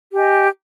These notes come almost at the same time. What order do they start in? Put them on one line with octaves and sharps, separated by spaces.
G4 G#5 D#5